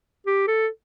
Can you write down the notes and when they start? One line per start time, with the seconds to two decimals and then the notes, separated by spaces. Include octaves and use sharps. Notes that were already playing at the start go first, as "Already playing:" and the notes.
0.27 G4
0.47 A4